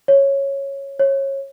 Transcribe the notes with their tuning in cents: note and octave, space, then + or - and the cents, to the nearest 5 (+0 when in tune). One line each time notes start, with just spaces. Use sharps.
C#5 -10
C#5 -25